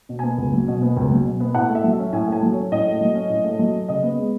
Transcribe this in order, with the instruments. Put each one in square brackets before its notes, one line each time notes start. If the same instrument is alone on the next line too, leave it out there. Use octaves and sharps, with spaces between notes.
[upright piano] B2
B3 G#5
C#2
F#3
B2
B3
C#2
F#3
B2
B3
A2 F#5
A3
E5
F#3
E5
C#4
A2 G#5
A3 G#5
F#3
C#4 C#5
A2 D#5
A3
F#3
C#4
A2
A3
F#3
C#4
C#3 D#5
B3
G#3